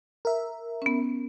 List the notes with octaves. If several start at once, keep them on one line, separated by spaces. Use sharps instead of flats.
A#4 E5
B3 C#4